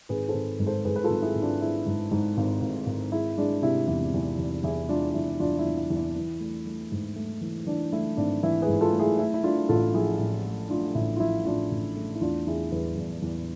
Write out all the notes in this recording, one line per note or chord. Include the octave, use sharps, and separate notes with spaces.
G#1 G#4 B4
A4 C5
G#1
G#2
A4 C5
G#2 G#4 B4
B4
F4 A4
G#1
E4 G#4
G#1
D4 F4
G#3 E4
G#2
G#2
G#1
G#1
G#1
G#3 E4
G#3 D4
C3 E4
E2 E4
E2
E2
E2 E4 G#4
G#3 D4 F4
E2 E4
E2 D4 F4
E4
E2
E4
E2
E4
E3
A3
A3
G#2
A3
E3
E3 D4
A3 E4
G#1 D4
E3 E4
G#4 B4
G#2
F4 A4
A3
E4 G#4
A3 E4
E4
A3 D4 F4
A1 F4 A4
F3 E4 G#4
A2
A3
A3 D4 F4
A1 E4
F4
F3 E4
A2 D4 F4
A1
A3
E4
E2 D4 F4
E2 E4 G#4
E2 G#4 B4
E2
E2